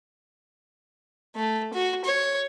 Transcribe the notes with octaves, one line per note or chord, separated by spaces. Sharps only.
A3
F#4
C#5